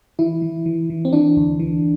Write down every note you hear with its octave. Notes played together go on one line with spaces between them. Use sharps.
E3 E4
E3
E3
E3
C4
E3 D4
D2
E3